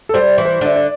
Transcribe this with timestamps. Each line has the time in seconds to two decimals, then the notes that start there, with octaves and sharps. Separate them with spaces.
0.09 A4
0.14 G3 C5
0.38 E3
0.45 C5
0.61 D3 D4 E5
0.76 D5